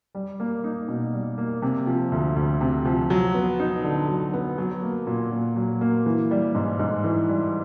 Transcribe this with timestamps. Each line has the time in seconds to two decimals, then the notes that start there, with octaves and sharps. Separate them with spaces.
0.15 G3
0.40 A#3
0.64 D#4
0.88 B2
1.13 G3
1.38 A#3
1.62 C3
1.87 F3
2.12 D2
2.36 D2
2.61 C3
2.85 F3
3.10 F#3
3.34 B3
3.60 D#4
3.84 D3
4.08 F#3
4.34 B3
4.58 F#3
4.83 A#3
5.07 A#2
5.32 A#2
5.56 F#3
5.81 A#3
6.06 E3
6.31 G3
6.55 G#2
6.79 G#2
7.04 E3
7.29 G3